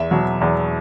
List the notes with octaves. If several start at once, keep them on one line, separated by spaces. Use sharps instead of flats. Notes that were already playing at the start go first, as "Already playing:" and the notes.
Already playing: E2 E5
B2 F#3
E2